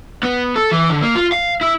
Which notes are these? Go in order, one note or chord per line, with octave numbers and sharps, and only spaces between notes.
B3
A4
E3
D3
A#3
F4
F5
E4